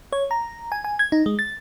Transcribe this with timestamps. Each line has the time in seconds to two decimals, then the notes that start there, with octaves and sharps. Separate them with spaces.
0.13 C#5
0.31 A#5
0.72 G#5
0.84 G#5
0.99 G#6
1.12 D#4
1.26 G#3
1.39 A6